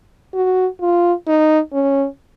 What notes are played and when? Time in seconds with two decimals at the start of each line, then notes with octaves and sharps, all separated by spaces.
0.34 F#4
0.81 F4
1.27 D#4
1.73 C#4